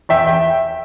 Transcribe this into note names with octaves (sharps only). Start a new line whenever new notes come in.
E2 E5 G5
E5 G5